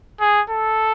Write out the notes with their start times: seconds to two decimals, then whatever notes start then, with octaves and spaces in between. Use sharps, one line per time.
0.20 G#4
0.50 A4